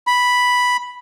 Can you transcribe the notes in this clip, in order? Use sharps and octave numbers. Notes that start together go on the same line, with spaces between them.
B5